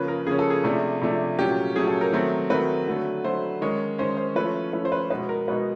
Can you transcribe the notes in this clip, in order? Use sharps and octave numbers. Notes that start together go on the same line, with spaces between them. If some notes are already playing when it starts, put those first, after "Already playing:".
Already playing: C#3 F3 A#3 C#4 B4
A#4
C#3 F3 A#3 C#4 G#4
A4
G#4
C3 F3 A3 D4
C3 F3 A3 D4
A#2 F#3 A3 C#4 G4
A#2 F#3 A3 C#4 G#4
A4
A#4
D#3 F#3 A3 C4
D#3 F#3 A3 C4 B4
D3 F#3 A3
D3 F#3 A3 C5
D#3 G#3 C#4 C#5
D#3 G#3 C#4 C5
C5
F3 A3 C#4 B4
F3 A3 C#4 B4
C5
B4
B2 G#3 B3 D#4 B4
A#4
B2 G#3 B3 D#4 B4